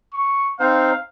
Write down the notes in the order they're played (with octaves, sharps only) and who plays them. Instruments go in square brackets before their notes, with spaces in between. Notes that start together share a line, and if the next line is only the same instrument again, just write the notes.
[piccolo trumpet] C#6
[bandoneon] C4 D#4 C5 [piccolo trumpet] F5